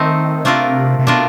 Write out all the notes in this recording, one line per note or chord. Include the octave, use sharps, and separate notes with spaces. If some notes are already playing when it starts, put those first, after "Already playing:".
Already playing: D#3 A3 C4 D#4
C3 A3 D4 F4 A#4
C3
B2 A3 D4 F4 A#4